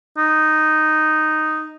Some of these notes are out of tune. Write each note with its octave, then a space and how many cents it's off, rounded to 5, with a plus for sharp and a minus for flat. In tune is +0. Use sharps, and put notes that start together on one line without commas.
D#4 -5